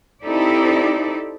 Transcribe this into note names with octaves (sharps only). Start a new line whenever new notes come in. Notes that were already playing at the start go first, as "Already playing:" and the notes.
C4 D#4 E4 G4 A4 D5